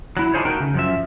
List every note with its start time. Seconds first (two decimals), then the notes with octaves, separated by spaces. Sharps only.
0.17 F#3 E4
0.34 D4 D#4 F4 G#4 C5 C#5
0.45 A3 D#4 F#4 A#4 G5
0.60 C#3
0.74 F#2 F3 E5